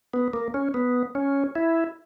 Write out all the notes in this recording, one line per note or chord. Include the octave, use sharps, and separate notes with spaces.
B3
A#3
C#4
B3
C#4
E4